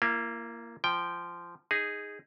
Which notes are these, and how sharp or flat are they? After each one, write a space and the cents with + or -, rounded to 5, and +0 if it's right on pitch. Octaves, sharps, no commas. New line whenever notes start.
A#3 +0 E4 +45
F3 -15 G5 +0
D#4 +0 G#4 -10